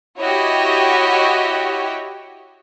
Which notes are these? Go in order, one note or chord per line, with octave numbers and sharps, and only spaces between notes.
E4 F#4 G4 C#5 D#5